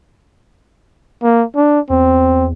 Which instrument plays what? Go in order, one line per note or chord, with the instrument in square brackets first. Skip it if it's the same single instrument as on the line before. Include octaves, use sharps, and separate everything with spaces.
[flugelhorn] A#3
D4
[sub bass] E2 [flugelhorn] C4